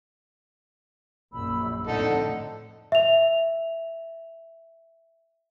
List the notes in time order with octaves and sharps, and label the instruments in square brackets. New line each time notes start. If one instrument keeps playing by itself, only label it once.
[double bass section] A#1 F#2 [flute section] B5 E6
[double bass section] F2 A2 D3 [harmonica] D#4 A4 [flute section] F#5
[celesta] E5 F7